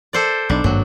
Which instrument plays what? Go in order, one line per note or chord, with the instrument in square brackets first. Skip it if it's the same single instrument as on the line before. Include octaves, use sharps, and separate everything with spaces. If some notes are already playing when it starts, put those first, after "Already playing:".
[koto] A4 C5 D5
[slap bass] B1 [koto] D4
[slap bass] G#1 G2 A#3 [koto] F#3